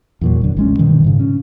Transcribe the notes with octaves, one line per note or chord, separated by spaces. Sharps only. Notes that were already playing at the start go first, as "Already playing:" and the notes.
E2 A#2 F#3
F1 D3
A1 G#3 C#4
G2 B2 D#3 E3
G#2 C#3
C#4